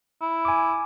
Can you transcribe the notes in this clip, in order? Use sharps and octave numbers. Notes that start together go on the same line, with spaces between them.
E4
G#5 D6